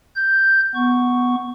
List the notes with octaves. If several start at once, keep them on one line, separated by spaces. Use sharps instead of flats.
G6
B3 C#6